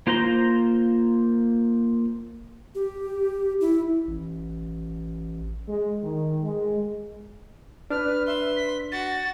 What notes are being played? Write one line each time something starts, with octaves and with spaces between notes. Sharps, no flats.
A#3 F4 C5 A#5 C6
G4
E4
A1
G#3
D#3
G#3
D4 B4 F6
E5 C6
B6
F#4 A6